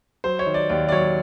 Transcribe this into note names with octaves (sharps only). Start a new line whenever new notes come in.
F#3 C5
C#5
D#3
D5
D#2 D5
D5
F#3 C#5